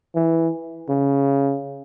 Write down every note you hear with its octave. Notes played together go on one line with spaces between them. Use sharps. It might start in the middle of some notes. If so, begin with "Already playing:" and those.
E3
C#3